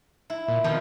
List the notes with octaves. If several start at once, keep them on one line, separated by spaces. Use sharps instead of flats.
E4
A#2
F2 B2 D#3 F3